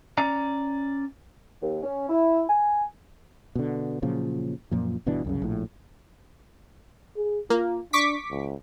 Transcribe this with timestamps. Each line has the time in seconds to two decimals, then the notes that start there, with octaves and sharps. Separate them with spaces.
0.18 C#4 D5 A#5
1.62 D#2
1.83 C#4
2.09 E4
2.48 G#5
3.55 B2 D3
4.02 A#2 C#3 F3 F#3
4.71 F#2 A#2 F3
5.06 G1 B2 E3 D4
5.25 C2 F#2 C#3
5.42 A#1 A2
7.16 G#4
7.50 A#3 F4
7.93 D4 C#6 D6 B6
8.30 C#2